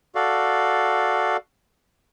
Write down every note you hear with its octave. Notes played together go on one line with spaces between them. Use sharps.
F#4 A4 D5 F5